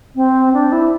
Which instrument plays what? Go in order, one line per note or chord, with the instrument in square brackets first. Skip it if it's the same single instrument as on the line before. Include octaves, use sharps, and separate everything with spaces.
[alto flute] C4
D4
E4